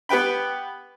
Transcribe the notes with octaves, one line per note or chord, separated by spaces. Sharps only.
B3 G4 B4 G5 B5